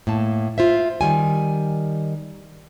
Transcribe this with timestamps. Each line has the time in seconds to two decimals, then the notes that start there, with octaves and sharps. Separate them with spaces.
0.07 A2 A#3 A5
0.58 F4 C5 E5
1.01 D#3 G3 G#5